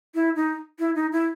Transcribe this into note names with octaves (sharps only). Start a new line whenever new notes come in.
E4
D#4
E4
D#4
E4